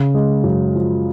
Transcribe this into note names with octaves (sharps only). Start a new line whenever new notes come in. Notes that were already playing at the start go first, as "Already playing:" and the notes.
Already playing: C#3
G#3
F#2
F3